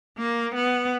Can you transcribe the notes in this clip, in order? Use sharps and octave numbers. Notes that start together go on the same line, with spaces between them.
A#3
B3